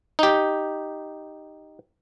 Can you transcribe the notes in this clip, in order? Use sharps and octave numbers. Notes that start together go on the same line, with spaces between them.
D#4 G4